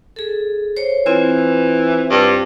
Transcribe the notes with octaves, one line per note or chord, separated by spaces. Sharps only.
G#4 A4
C5 C#5
E3 C4 F4 C5
G2